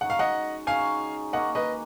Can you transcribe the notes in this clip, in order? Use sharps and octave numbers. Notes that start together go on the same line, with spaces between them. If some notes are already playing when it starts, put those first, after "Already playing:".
C#3 G#3 D#4 F#4 F#5
F5
D#5 F#5
C#3 G#3 D#4 F#4 F5 G#5
D#3 A#3 C#4 D#5 F#5
B4 D#5